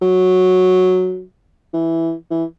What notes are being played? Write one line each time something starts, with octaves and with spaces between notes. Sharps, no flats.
F#3
E3
E3